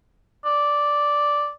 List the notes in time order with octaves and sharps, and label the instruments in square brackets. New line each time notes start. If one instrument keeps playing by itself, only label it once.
[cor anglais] D5